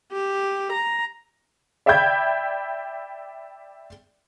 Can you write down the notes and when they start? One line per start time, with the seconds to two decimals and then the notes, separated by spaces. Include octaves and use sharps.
0.12 G4
0.72 A#5
1.86 D5 E5 G5 B5 G6 G#6